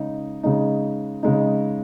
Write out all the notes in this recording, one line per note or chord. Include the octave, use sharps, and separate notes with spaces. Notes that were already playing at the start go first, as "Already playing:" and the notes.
Already playing: C#3 G#3 D#4
C#3 G#3 D#4
C#3 G#3 D#4